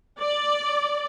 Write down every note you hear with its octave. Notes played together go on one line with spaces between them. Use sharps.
D5